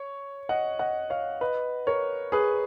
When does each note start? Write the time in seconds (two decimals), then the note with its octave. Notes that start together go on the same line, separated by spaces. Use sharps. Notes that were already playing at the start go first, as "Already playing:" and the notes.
Already playing: C#5
0.49 D#5 F#5
0.79 D#5 F#5
1.10 C#5 F5
1.41 B4 D#5
1.87 A#4 C#5
2.32 G#4 B4